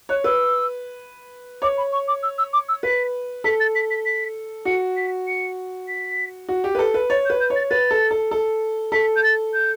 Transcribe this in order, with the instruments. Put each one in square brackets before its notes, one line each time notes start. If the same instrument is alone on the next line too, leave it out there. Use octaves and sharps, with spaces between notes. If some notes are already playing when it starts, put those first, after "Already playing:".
[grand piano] C#5 [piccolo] F#6
[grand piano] B4 [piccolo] E6
[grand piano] C#5 [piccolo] D6
[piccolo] B5
C#6
D6
E6
E6
D6
E6
[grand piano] B4 [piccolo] B6
[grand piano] A4 [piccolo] B6
[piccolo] A6
B6
B6
B6
[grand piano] F#4 [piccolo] C#7
[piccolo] B6
C#7
B6
[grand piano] F#4
G4
B4
A4
B4
[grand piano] C#5 [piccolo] A6
[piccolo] G6
[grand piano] B4
[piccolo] G6
[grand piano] C#5
[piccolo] A6
[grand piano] B4 [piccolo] A6
[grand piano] A4
A4
A4
[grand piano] A4 [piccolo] B6
[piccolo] G6
A6
G6